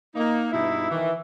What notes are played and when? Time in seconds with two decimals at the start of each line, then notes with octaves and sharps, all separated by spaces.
0.15 A#3 D#4
0.52 G2 B2 D#4 E4
0.91 D#3 E3